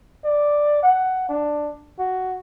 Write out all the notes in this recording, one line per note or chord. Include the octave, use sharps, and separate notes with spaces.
D5
F#5
D4
F#4